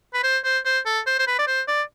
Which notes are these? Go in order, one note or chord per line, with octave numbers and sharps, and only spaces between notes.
B4
C5
C5
C5
A4
C5
C5
B4
D5
C5
D5